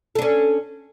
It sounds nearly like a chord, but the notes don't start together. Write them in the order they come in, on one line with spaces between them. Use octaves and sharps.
A4 D4 C#4